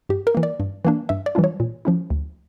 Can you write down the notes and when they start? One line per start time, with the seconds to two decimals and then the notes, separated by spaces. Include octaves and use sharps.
0.09 G2 G4
0.27 A#4
0.35 E3 A#3
0.43 D5
0.60 G2
0.85 E3 A#3 D4
1.09 G2 E5
1.26 D5
1.35 E3 G3 D4 F4
1.44 C#5
1.60 A#2
1.85 F3 C#4 E4
2.10 D2